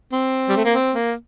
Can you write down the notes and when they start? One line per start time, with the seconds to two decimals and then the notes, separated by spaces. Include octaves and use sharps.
0.13 C4
0.49 G3
0.57 A3
0.65 A#3
0.74 C4
0.95 A#3